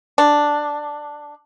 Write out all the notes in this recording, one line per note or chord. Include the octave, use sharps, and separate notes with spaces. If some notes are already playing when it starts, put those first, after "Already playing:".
D4